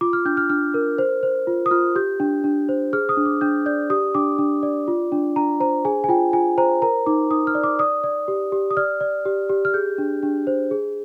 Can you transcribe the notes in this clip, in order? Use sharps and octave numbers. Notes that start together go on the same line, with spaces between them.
F4 D6
F6
D4 G6
F6
D4 F6
A#4
C5
C5
F4
D#6
F4 F6
G4 G6
D4
D4
C5
G#4 F6
D#6
D4
D6
D4 G6
D5 G6
G4 D#6
D4 D6
D4
D5
F4
D4
D4 A#5
C5 A#5
G#4 G#5
G#5
F4 G5
F4 G#5
C5 A#5
A#4 A#5
D#4 D6
D#4 D#6
F6
D5
D6
D5 D#6
D5
G4
G4
D#6
D5 F6
D5
G4
G4
F6
G#4 G6
D4
D4
C5
G#4